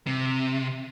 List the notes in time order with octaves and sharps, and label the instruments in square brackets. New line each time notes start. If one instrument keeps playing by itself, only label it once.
[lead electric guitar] C3